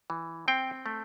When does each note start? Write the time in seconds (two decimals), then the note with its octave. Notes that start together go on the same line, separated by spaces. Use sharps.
0.10 E3
0.48 C4 G5
0.86 A3